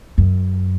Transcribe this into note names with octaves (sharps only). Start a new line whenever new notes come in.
F#2